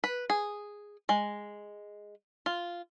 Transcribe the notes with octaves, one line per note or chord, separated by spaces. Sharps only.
B4
G#4
G#3
F4